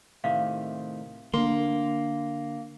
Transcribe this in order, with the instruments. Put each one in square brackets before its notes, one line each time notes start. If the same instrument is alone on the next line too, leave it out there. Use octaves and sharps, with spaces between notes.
[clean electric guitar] A2 C3 D#3 [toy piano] E5 F5
[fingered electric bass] D3 D4 [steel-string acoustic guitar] A#3 [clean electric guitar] C6